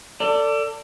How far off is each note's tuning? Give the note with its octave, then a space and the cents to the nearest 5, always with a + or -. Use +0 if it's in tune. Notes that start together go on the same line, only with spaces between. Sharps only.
A4 +30 D5 -10